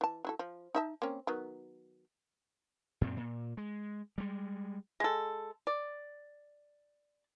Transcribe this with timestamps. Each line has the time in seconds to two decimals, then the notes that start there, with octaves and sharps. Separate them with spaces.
0.01 E3 A5
0.25 F#3 E4 A4
0.39 F3
0.75 D#4 E5 A5
1.02 A#3 C4 C#4
1.27 D#3 F#3 B3
3.01 F#2 A#2 C4
3.17 A#2
3.57 G#3
4.18 G3 G#3
5.00 G#3 A4
5.67 D5